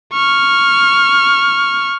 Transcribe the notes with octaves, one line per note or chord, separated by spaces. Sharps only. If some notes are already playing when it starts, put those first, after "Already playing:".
C#6 F6